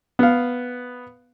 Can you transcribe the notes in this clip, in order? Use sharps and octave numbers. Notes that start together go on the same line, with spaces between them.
B3 F5